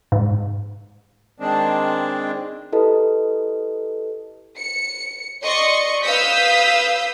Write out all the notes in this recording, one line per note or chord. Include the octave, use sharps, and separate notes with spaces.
G#2
D#3 G#3 C4 D4
E4 G4 A4 B4 D#5
C#7
D5 D#5 C6 C#6 C#7
B4 F5 D#6 E6 G6 B6